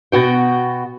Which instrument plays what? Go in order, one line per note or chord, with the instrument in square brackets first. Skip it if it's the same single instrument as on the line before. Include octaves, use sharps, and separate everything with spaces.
[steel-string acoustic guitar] B2 F#4 G5